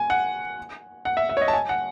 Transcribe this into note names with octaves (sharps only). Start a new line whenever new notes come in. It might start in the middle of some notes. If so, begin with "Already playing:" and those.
Already playing: G#5
F#5
F#5
E5
E5
C#5
D#5
A5
G#5
F#5